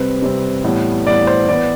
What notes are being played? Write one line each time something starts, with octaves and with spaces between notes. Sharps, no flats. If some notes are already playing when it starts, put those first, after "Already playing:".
Already playing: C3 G3 C4 B4
C3 G3 C4
A2 E3 G3 B3
A2 E3 G3 B3 D5
C5
E3 B3 D5